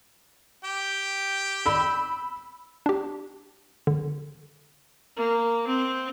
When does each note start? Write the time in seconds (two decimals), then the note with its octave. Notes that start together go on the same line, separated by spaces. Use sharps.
0.64 G4 G5
1.66 B5 E6
2.86 D4 G4
3.87 D3
5.17 A#3
5.67 C4